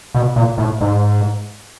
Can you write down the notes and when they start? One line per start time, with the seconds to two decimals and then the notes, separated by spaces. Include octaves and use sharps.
0.15 B2
0.36 A#2
0.58 A2
0.81 G#2